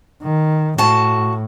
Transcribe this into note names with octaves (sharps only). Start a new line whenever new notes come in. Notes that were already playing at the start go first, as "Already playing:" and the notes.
D#3
A2 F#4 A5